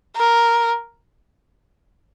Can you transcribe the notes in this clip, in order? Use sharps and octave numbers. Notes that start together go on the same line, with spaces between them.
A#4